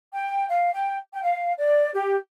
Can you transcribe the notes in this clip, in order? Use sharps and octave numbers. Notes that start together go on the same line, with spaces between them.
G5
F5
G5
G5
F5
D5
G4